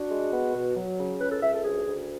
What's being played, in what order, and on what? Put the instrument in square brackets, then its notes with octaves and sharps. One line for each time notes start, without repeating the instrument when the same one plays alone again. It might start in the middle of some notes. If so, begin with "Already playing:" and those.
Already playing: [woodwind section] D4 F#4
G#3
B3
B2
F#3
C#3
C#2 B4
A4
C#2 E5
A4
D2 G#4
D2